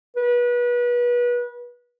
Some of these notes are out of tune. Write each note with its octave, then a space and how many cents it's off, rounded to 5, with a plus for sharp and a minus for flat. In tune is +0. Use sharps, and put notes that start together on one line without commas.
B4 -30